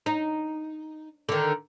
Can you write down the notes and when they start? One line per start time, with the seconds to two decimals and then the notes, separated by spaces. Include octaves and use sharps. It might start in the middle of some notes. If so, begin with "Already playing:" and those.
0.06 D#4
1.29 D3 D#3